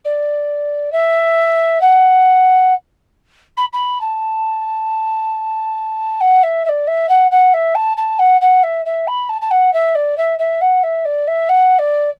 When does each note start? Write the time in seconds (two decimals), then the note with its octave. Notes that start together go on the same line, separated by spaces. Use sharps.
0.05 D5
0.92 E5
1.81 F#5
3.57 B5
3.73 B5
4.01 A5
6.21 F#5
6.43 E5
6.65 E5
6.69 D5
6.87 E5
7.09 F#5
7.31 F#5
7.54 E5
7.75 A5
7.97 A5
8.19 F#5
8.41 F#5
8.63 E5
8.85 E5
9.07 B5
9.29 A5
9.41 A5
9.51 F#5
9.73 E5
9.95 D5
10.17 E5
10.39 E5
10.61 F#5
10.83 E5
11.05 D5
11.27 E5
11.49 F#5
11.78 D5